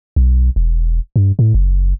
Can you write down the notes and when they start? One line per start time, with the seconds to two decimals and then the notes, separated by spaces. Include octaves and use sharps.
0.16 B1
0.56 E1
1.16 G2
1.39 A2
1.54 F#1